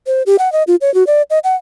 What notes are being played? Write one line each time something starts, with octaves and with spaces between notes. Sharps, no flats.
C5
G4
F#5
D#5
F4
C#5
F#4
D5
D#5
F#5